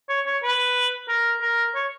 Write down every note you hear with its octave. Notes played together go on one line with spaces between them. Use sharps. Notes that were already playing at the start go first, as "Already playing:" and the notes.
C#5
C#5
B4
A#4
A#4
C#5